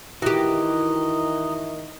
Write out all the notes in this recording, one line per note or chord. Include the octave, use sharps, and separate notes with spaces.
D#3 E3 F#4 G4 D#5 A#5